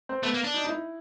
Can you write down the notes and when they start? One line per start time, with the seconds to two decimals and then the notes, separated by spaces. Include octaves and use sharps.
0.09 C4
0.23 A3 B3
0.34 A#3
0.44 D4
0.54 D#4
0.64 D#4
0.69 E4